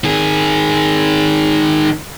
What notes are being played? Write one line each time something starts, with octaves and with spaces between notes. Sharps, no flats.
D#3 G#4